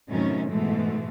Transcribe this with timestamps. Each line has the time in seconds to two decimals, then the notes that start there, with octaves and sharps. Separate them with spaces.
0.10 F#2 A2 C3 D#3 A3 C#4
0.49 G#2 B2 E3 G#3 A3